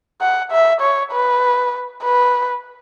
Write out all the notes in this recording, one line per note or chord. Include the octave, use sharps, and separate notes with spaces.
F#5
E5
C#5
B4
B4